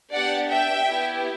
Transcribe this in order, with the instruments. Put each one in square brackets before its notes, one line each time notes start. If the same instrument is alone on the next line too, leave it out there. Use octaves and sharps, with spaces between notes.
[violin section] B3 D4 G4 D5 F#5
E5 G5
B3 E4 G4